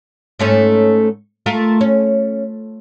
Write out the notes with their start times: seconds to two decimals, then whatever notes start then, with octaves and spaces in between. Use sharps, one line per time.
0.39 G#2 A3 C#4
1.46 A3 F4 A#4
1.81 C#4